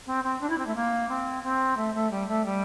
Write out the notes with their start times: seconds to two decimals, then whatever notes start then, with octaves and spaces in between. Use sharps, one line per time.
0.06 C4
0.24 C4
0.41 D4
0.49 E4
0.58 C4
0.66 A3
0.75 A#3
1.09 C4
1.43 C4
1.77 A3
1.94 A3
2.11 G3
2.28 A3
2.45 G3